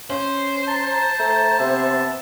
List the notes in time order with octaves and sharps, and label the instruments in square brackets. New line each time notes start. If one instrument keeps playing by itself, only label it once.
[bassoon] C#4 [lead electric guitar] C5
[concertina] A5 [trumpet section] A#5
[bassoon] A3 [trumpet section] A4 A#5
[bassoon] C3 [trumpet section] B3 E5